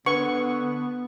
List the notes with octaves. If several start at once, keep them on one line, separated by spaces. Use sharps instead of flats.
D3 B3 B4 F#5 C#6